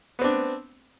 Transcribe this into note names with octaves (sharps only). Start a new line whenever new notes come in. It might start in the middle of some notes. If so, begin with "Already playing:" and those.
B3 C4 D4